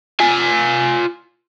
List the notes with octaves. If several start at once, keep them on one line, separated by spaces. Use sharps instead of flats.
F4 G#5